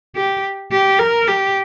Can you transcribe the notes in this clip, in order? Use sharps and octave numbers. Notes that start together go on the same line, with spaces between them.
G4
G4
A#4
G4